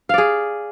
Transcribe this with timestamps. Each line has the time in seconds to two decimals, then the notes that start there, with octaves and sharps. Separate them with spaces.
0.09 F5
0.14 D5
0.18 G#4